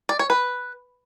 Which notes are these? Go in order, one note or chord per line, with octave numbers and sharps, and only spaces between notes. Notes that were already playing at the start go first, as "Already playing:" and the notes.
D5
C#5
B4